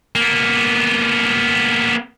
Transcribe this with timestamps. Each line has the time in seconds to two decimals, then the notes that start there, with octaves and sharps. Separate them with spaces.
0.16 A#3 B3